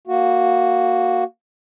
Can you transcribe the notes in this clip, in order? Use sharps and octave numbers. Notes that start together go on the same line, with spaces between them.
A#3 F#4